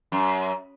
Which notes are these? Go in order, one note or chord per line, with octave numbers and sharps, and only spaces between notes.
F#2